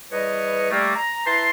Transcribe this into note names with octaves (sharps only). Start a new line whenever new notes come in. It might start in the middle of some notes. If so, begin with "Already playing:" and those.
E2 G3 B4 C#5 D#5
G3 A3 A#3
A#5
E4 B4 A5 A#5 C6